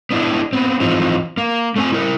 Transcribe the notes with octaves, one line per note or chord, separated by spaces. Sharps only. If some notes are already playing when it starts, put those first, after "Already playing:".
B3 D4 E4
B3 C4
E3 F3 C4 D#4
A#3
A3 C4 G#5
E4 A#4 E5